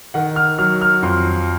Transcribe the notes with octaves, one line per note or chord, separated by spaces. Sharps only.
D#3 F#5
F6
F#3 F6
F6
F2 C6